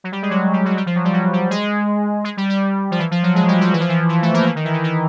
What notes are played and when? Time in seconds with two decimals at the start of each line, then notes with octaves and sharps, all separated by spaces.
0.04 F#3
0.12 G3
0.22 G#3
0.30 F#3
0.53 G3
0.65 F#3
0.77 G3
0.86 F3
0.95 F#3
1.04 G3
1.13 F#3
1.33 G3
1.50 G#3
2.24 G#3
2.37 G3
2.50 G3
2.91 F3
2.99 E3
3.11 F3
3.23 F#3
3.35 G#3
3.48 G3
3.61 F#3
3.73 E3
3.80 F3
3.89 E3
4.09 E3
4.22 A3
4.34 A#3
4.46 E3
4.55 D#3
4.65 E3
4.73 D#3
4.84 E3